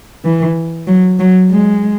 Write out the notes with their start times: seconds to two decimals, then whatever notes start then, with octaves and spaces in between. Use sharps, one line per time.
0.25 E3
0.87 F#3
1.19 F#3
1.50 G#3